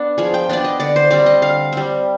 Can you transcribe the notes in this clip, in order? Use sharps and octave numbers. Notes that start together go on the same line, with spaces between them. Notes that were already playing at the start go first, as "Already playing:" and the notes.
Already playing: B3 D4
F3 G#4
G5
B3 D4 D5
D#5
D3 D5
C5
G3 C4 D5
D#5
D3 F5
G3 C4